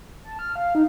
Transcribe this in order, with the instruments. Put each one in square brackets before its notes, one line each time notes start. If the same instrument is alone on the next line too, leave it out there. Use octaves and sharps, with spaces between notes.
[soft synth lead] A5
F6
F5
D#4